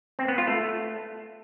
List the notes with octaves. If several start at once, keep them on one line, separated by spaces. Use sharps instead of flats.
C4
B3
F4
A3